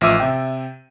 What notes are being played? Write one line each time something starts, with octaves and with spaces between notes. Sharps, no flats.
A1 F3 E5 D6 E6 D#7
C3 E5 G5